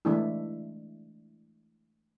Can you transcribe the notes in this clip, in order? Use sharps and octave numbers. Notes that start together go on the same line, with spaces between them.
E3 G#3 A3 D4 E4